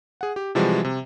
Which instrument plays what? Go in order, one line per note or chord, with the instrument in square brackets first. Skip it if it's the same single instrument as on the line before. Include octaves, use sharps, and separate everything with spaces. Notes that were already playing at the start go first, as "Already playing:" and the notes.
[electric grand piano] G#4 F#5
G4
C3 E3 F3 G3 G#3 F#4
C3